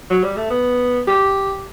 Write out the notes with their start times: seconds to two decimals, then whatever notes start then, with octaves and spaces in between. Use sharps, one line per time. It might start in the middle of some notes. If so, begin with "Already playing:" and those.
0.10 F#3
0.23 G3
0.36 A3
0.50 B3
1.07 G4